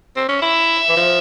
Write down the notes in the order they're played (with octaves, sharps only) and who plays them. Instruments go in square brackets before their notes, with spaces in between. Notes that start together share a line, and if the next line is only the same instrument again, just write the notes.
[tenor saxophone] C4
C#4
[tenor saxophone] E4 [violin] E5
[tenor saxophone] E3
F3